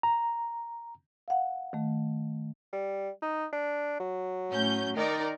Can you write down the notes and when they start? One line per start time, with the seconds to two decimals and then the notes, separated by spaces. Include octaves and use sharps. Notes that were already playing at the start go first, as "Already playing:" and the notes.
0.03 A#5
1.28 F5 F#5
1.73 D#3 A3
2.73 G3
3.22 D#4
3.53 D4
4.00 F#3
4.50 A2 C#4 G6
4.96 D#3 D#4 A#4 D5